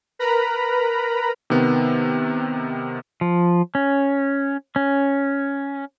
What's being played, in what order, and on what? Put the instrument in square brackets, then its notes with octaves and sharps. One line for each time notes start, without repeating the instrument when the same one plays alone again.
[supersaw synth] A#4 B4 A#5 B5
[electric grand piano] C3 D#3 B3
[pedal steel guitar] F3
C#4
C#4